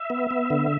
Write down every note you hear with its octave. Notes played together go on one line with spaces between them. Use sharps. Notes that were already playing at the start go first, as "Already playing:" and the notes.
Already playing: E5
B3
B3
D3